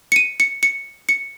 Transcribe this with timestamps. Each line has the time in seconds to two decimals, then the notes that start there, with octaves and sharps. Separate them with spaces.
0.12 C#7
0.16 D#7
0.40 C#7
0.63 C#7
1.09 C#7